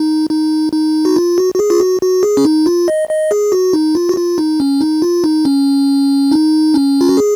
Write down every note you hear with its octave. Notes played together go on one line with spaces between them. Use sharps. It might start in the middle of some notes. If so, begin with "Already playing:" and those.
Already playing: D#4
D#4
D#4
F#4
F4
F#4
F#4
G#4
F4
F#4
F#4
G#4
C#4
D#4
F4
D#5
D#5
G#4
F#4
D#4
F4
F#4
F4
D#4
C#4
D#4
F4
D#4
C#4
D#4
C#4
F4
F#4
G#4